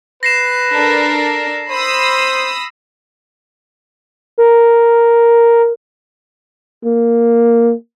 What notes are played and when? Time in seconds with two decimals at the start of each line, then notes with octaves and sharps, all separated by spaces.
0.23 B4 A#6 C7 E7
0.69 D4 A4 A#4
1.69 C5 B5 D#6 E6
4.38 A#4
6.85 A#3